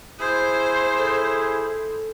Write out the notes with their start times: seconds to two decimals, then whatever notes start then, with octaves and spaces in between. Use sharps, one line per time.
0.19 E4 G#4 C5
0.98 A4